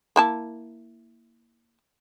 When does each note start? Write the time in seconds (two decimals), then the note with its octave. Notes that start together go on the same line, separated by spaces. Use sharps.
0.16 A#3 E4 A5